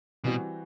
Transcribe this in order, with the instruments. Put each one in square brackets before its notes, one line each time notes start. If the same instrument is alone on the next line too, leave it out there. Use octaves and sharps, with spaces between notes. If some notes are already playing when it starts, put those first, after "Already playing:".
[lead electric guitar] B2 [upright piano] E3 G3 C4 F#4